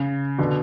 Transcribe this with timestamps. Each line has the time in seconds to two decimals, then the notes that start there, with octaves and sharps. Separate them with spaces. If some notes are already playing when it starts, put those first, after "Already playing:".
Already playing: C#3
0.38 B2 D3